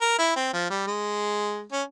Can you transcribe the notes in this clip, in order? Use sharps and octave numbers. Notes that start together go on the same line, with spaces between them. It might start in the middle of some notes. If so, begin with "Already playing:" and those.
A#4
E4
C4
F3
G3
G#3
C#4